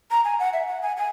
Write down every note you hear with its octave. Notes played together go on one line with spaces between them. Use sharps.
A#5
G#5
F#5
E5
F#5
G#5
G#5